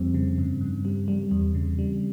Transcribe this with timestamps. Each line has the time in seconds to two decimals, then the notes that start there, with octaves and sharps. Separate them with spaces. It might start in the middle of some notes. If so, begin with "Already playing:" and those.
Already playing: F2 F3 G3 C4
0.14 C#3
0.38 G2
0.61 G2
0.85 G3
1.08 G3
1.31 E2
1.54 C#3
1.79 G3